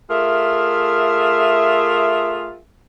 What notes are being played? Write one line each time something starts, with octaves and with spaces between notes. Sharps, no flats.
A3 F4 G#4 A#4 E5